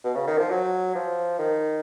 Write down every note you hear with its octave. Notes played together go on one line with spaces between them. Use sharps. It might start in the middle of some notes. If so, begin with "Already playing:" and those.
B2
C#3
D#3
F3
F#3
F3
D#3